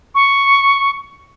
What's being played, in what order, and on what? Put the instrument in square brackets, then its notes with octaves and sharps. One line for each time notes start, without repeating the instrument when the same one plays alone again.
[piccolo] C#6